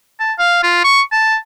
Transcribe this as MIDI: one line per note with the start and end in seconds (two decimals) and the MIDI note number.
0.20 0.33 81
0.39 0.60 77
0.63 0.80 65
0.84 1.01 85
1.12 1.36 81